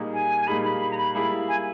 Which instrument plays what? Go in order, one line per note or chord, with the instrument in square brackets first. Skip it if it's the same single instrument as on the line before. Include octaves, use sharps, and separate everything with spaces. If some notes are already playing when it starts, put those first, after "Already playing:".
Already playing: [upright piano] A#2 G3 A#3 D#4 G#4
[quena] G#5
[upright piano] A#2 G3 A#3 D#4 G#4 [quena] B5
[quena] B5
B5
A#5
B5
[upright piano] G3 A#3 E4 G#4 [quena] B5
[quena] G#5